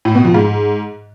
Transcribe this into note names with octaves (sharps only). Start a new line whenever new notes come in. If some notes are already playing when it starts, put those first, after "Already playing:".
A2
B2
F2
G#2